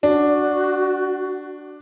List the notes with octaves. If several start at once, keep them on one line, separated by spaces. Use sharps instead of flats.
D4 F#4